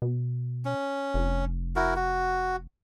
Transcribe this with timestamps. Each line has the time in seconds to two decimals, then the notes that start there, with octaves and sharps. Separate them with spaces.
0.02 B2
0.65 C#4
1.14 F1
1.76 E4 F#4 A#4
1.96 F#4